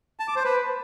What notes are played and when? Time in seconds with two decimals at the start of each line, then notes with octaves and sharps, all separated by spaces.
0.20 A5
0.28 D6
0.36 C5
0.44 B4